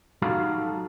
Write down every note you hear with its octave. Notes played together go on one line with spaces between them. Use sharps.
F#3 G3 D#4 F#4 A4 F5